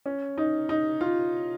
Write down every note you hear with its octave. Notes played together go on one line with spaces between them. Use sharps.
C#4
D#4
D#4
F4